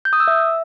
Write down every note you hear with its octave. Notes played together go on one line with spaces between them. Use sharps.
G6
D#6
E6
E5